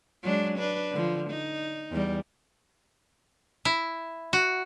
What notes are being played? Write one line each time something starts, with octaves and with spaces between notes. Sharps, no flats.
F#3 G#3 D4
D4 B4
D3 F3
D#4
E2 G3
E4
F#4